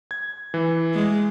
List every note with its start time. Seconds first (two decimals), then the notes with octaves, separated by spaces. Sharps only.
0.11 G#6
0.54 E3
0.94 G#3